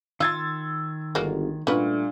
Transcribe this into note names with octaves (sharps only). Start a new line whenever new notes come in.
D#3 F4 C6 E6 G#6 A6
G1 F#3 G#3 A#3
A#2 G3 A3 C#4 D4 F#4 B4